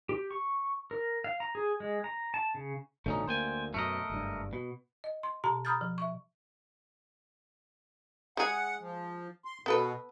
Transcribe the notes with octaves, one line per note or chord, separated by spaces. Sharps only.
G4
C#6
A#4
F5
A#5
G#4
G#3
A#5
A5
C#3
A1 B2 D3 A3 C#4 D#4
D2 A#3 C5 G5 G#5
F#2 B2 A3 A#4 D#5
F#1 G2
B2
D#5
C6
B2 G4 A5 A#5
A#5 B5 D#6 F6 G6 A6
F3
E5 C#6
G#3 G#4 F#5
F3
C6
B2 B3 A4 B4